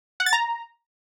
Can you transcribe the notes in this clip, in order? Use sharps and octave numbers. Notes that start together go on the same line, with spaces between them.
F#5
A6
A#5